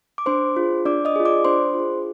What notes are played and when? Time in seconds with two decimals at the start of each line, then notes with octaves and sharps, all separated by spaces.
0.18 D6
0.26 D4 C5 C6
0.56 F4 G#4
0.85 D4 D5 D6
1.05 D#5 D#6
1.16 F4 G#4
1.25 D5 D6
1.45 D4 C5 C6
1.74 F4
1.79 G#4